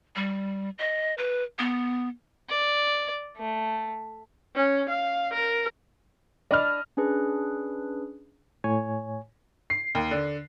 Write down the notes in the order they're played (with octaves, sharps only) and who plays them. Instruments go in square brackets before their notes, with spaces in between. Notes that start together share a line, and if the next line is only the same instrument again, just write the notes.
[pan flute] G3
D#5
B4
B3
[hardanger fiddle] D5
A3
[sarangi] C#4
F5
A#4
[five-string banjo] D4 D5 [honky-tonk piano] D#5 B5 F6
[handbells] C#4 D4 G#4 B4
[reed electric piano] A2 C#5 G#5
[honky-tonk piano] C7
D#2
D3